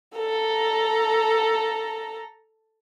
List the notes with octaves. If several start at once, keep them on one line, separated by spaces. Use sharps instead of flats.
A4 A#5